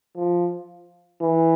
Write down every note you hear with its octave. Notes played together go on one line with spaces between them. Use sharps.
F3
E3